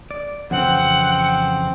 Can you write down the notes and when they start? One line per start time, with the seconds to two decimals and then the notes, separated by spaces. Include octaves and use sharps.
0.11 D5
0.51 F2 C#3 E3 C4 F#5